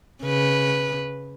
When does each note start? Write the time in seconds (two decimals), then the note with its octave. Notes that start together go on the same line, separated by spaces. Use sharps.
0.23 C#3 B4